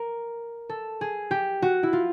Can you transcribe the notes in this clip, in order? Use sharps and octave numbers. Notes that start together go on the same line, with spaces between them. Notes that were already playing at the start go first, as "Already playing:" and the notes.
Already playing: A#4
A4
G#4
G4
F#4
E4
F4